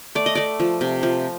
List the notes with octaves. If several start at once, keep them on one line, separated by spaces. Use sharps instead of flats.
A3 D5
D#5
A3 D5
F3
C3
F3